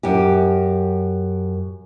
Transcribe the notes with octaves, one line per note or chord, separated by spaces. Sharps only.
F#2 G4